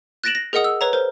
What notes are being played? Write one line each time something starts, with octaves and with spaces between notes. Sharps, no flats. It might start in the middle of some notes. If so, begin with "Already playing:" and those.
F#6 A6 A#6 D7 E7 F#7
A#6
G#4 A#4 D#5 F#5 D#6
E6
B4 C#5 A#5
A#4 C5